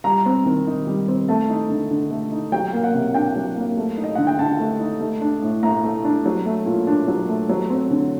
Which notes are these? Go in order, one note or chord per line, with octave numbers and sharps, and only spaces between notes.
G3 A#5
C4
D#3
D#4
G3
C4
A3 A5
D#4
D3
D3
A3
D#4
F#3 G5
A#3
F#5
C3
D4 G5
F#3
A#3
A3
D#4
D#5
D3 F#5
G5
D3 A5
A3
D#4
A3
D4
A2
A2 A#5
A3
D4
F#3
A3
A#2
D4
F#3
A3
F#3
C4
D3